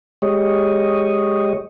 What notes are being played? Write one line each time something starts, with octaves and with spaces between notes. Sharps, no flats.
G#3 G4 C#5 D#5